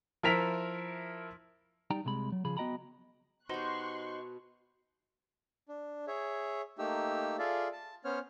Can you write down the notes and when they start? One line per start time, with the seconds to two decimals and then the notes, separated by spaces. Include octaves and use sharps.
0.23 F3 E4 A#4 E5 B6 F7
1.90 G3 D#4 G5 A#5
2.05 C2 C3 G#3 B5
2.32 F#3
2.45 C#3 F3 G#4 B5
2.57 B3 F#4 D#5 G5 A#5 B5
3.49 B2 D#4 G4 C5 C6 C#6 F#6
5.69 D4
6.07 G#4 C#5 E5
6.79 A3 A#3 D#4 G4 E6
7.39 F4 G#4 A4 D5 E5 F5
7.73 A5
8.05 B3 C#4 C5 C#5 F6